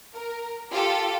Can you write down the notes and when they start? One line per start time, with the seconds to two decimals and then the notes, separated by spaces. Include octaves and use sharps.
0.14 A#4
0.71 F4 G4 A4